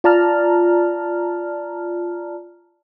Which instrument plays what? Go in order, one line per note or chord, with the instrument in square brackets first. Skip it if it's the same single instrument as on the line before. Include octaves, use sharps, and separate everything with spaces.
[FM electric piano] F4 D5 A5 A#5 F6